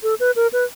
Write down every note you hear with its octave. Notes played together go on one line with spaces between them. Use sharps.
A4
B4
A#4
B4